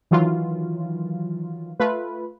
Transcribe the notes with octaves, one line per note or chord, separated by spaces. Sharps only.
D#3 E3 F#3 F4
A3 F4 B4